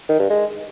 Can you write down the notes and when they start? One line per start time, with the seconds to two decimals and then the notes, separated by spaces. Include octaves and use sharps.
0.09 D#3
0.20 G2
0.30 G#3